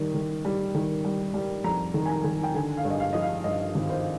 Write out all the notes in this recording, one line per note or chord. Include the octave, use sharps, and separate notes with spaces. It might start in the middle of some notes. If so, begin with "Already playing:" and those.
Already playing: D#3 G3
D#3
G3
D#3
G3
G3
F2 A#5
D#3
G#5
A#5
D#3
G5
D3 G#5
F5
G2
D#5
F5
F3 D#5
F5
G2 D#5
G#1
C5